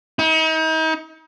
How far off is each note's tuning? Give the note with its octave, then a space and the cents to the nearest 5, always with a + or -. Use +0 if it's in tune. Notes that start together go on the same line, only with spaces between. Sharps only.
D#4 +40